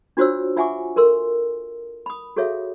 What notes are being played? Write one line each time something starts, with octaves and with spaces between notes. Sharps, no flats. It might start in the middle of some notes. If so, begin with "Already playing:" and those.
D4 F4 F#4 C5 C#5 E6
F4 E5 F#5 G#5 C#6 D6
A4 A#4 C6 E6
B5 D#6
F#4 G#4 A4 C#5 E5 F5